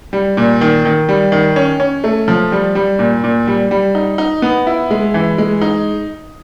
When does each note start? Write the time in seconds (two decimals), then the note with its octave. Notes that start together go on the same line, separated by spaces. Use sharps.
0.13 G3
0.37 A#2
0.61 D#3
0.85 D#3
1.09 G3
1.32 D#3
1.56 C#4
1.80 C#4
2.04 A3
2.28 F3
2.52 G3
2.75 G3
2.99 A#2
3.24 A#2
3.47 G3
3.71 G3
3.95 D#4
4.18 D#4
4.42 B3
4.67 E4
4.91 G#3
5.14 E3
5.38 G#3
5.61 D#4